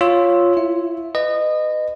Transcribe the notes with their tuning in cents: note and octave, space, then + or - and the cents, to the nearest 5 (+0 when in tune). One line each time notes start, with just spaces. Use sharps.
F4 +0 C#5 +0 E6 -10
E4 +30 E5 +0
B4 +25 D#5 -20